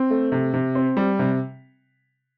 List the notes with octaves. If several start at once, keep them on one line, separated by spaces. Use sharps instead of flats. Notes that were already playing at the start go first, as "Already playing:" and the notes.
Already playing: C4
A3
C3
C3
C4
G3
C3